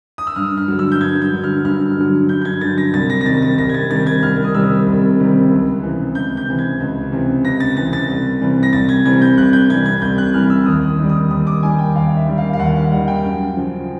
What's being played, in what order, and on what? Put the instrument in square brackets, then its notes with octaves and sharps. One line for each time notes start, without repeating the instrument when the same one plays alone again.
[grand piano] D#6
E6
G2 F6
F6
D3 F#3
E6
G6
G2 G#6
G6
D3 F#3
F6
G2 F6
D3 F#3
G2 G6
G6
G#6
D3 F#3 A6
A#6
C2 A6
A#6
A#6
C3 D#3 G3 A6
A6
C2 A#6
G#6
A6
C3 D#3 G3 A6
G#6
C2 F6
D#6
C3 D#3 G3 E6
C2
C3 D#3 G3
C#2
C3 E3
C#2 G6
G6
C3 E3
G#6
C#2
C3 E3
C#2 A#6
A6
C3 E3 A6
A6
C2
C3 E3 G3
A#6
C2 A6
G#6
C3 E3 G3 G#6
G6
C2 F#6
G6
C3 E3 G3 G#6
G#6
C2 G6
F#6
C3 E3 G3 F6
E6
D#2 D#6
D#3 G3
D#6
D#2 D#6
D6
D#3 G3 G#5
G5
D#2 F5
E5
D#3 G3
F5
F5
D#2 F#5
F5
G3 F#5
D#3
G5
F#2
C#3 F3